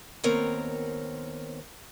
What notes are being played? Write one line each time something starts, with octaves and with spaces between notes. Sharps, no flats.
D#2 B3 C4 A#4 C#5